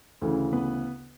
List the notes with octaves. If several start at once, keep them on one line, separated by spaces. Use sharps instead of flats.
D2 C#3 E3
B3 B4